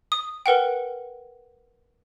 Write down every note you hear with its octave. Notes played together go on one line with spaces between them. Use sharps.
D#6
A#4 B4 F#5 G5